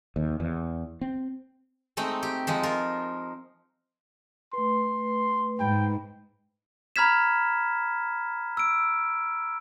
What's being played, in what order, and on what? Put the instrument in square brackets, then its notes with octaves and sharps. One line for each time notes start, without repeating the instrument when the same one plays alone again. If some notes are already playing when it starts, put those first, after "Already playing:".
[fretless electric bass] D#2
E2
C4
[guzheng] G#3 A3 C4 D#4
G4
F3 G#3 D#4
F4 A#4
[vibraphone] A3 B4 [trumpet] C6
[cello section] G#2 [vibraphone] B4 B5 [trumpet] G5
[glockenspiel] A#5 B5 F6 G#6 B6 E7
E6 D7